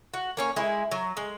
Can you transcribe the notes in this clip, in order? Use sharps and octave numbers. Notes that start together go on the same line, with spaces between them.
F#4
A#3 C#4 C#5
G#3 E4 G#4
F#3
G#3